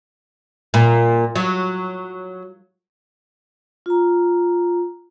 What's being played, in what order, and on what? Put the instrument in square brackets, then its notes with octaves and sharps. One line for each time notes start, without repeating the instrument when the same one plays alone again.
[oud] A#2
F#3
[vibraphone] F4 A#5